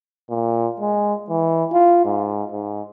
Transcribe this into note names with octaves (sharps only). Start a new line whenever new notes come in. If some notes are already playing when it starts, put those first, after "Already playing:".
A#2
G#3
E3
F4
G#2
G#2